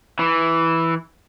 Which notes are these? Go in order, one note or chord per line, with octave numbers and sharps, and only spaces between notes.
E3